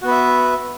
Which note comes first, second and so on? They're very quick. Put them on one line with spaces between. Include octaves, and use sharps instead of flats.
F#4 B3 B4 E5